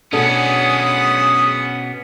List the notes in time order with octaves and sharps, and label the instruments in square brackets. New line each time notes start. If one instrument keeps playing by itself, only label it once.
[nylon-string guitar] B2 D4 A4 [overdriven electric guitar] B3 C#4 [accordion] G#4 D#6 [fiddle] F#5